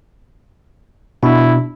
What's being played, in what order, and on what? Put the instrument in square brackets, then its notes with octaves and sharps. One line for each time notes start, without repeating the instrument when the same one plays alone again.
[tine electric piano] B2 D4 [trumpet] E4